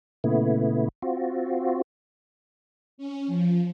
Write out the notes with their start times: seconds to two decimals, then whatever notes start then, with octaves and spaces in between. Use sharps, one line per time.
0.24 A#2 C#3 A3 B3 E4
1.02 C4 F4 F#4
2.98 C#4
3.27 F3